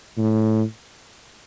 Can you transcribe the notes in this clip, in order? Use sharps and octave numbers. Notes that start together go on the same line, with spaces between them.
A2